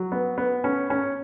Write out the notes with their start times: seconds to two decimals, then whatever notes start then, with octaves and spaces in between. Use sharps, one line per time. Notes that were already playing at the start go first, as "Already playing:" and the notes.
Already playing: F#3
0.12 B3
0.38 B3
0.64 C#4
0.90 C#4